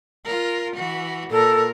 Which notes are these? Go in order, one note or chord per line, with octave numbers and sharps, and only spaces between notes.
F4 A#4
E3 F#4
A#2 A4 A#4